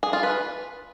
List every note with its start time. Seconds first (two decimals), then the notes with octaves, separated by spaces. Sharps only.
0.03 G#4
0.13 F4
0.23 B4